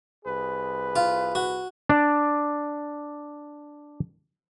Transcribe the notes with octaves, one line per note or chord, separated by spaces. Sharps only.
C2 G#4 B4
F4
F#4
D4 D5